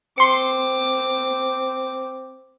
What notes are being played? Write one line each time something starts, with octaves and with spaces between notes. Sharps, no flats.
C4 C6 D6 C#7